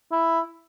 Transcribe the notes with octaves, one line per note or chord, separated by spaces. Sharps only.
E4